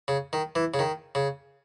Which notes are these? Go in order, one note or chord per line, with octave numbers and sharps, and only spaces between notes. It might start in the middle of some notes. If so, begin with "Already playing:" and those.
C#3
D#3
E3
C#3
D#3
C#3